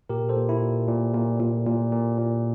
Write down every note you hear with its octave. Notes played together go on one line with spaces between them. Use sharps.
A#2 G4 A#4
A4 C5
A#2
E4
A#2
A#2
A#2
A#2
A#2
A#2
A#2